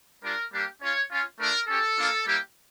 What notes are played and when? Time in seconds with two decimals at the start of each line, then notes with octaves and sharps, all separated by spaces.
0.23 G3 D4 F4 A#4
0.53 G3 A#3 D4 G4
0.82 C#4 F4 C#5
1.11 C#4 F4
1.40 A3 D4 F4 A#4
1.68 C#4 G4 A4
1.97 A#3 D4 F4
2.26 G3 A#3 E4 G4